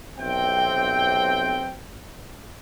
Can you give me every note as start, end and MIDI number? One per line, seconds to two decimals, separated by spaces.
0.19 1.75 35
0.19 1.75 48
0.19 1.75 60
0.19 1.75 79